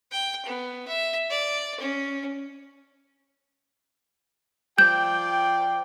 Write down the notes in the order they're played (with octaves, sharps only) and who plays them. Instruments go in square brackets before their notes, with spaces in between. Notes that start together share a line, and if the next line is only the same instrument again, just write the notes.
[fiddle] G5
B3
E5
D5
C#4
[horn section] F3 D5 G5 [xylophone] G6